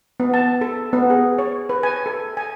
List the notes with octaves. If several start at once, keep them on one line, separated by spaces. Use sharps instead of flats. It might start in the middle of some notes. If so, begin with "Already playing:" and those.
B3
A5
A4
B3
G#4
C#5
B4
G#5
A4
G#5